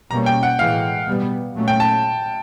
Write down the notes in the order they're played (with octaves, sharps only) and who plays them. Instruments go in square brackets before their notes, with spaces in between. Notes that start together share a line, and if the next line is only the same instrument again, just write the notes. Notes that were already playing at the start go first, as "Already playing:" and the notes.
[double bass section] B2 G3 A#3 C#4 [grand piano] A#5
[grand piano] G5
F#5
[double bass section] A2 E3 G#3 [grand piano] F5
[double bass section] B2 G3 B3
A#2 F#3 A3 C#4
[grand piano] G5
A5